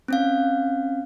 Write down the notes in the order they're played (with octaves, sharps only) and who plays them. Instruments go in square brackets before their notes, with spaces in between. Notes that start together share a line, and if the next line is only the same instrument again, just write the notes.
[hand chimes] C4 C#4 F5